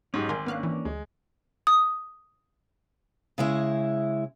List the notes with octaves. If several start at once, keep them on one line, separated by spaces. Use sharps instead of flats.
G#2 F#3 C#4 D#4 G4
G#1 A#4 G#5 C6
A#3 B3 C#4 D4 F5 F#6
E3
D2 G#3
D#6
C#3 G#3 E4